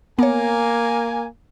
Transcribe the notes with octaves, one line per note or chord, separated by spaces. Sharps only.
A#3 B3 C#5 G#5